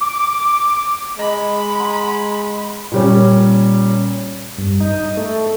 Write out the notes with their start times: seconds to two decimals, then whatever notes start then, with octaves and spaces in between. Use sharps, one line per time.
0.01 D6
1.19 G#3 D#5 B5 A#6
1.80 F#5 A#5 C6
2.92 A#2 G3 C#4
4.58 G2
4.80 D#4
5.17 A3